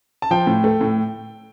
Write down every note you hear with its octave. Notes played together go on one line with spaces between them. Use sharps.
A5
F3 G5
A2
A3
A2